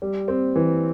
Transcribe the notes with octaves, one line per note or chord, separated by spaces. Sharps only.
G3
C4
E3